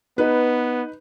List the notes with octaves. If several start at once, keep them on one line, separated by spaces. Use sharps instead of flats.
B3 D#4 B4